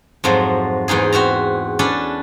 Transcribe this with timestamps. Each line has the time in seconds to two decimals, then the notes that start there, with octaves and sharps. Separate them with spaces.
0.24 F2 G#2 F3 F#3
0.88 E2 G#2 D#4 G#4
1.13 C4 F#4 E5 A#5
1.79 C#4 D4 A4 B4